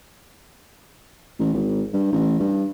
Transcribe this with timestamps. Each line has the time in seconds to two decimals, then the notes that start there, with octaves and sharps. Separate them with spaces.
1.40 A1
1.54 G#1
1.94 G2
2.12 A1
2.40 G2